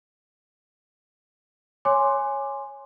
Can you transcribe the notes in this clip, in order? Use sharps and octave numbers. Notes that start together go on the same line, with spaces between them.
C#5 G#5 C6 D6